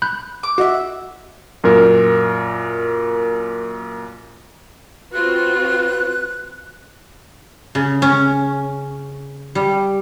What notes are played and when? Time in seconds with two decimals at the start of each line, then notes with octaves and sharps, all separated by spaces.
0.02 B5 F#6 G6
0.43 D6
0.58 F#4 D#5 E5 F#5
1.64 F#2 A#2 A#4
5.13 C4 F4 F#4 B4 F#6
7.75 C#3
8.02 C#4
9.55 G3